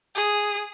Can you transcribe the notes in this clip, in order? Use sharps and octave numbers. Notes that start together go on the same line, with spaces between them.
G#4